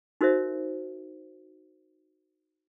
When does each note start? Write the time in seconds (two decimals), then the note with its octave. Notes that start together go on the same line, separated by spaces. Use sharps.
0.21 D#4 F#4 A#4 C5 E5